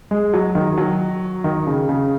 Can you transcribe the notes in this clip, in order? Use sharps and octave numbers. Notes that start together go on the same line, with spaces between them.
G#3
F#3
D#3
F#3
D#3
C#3
C#3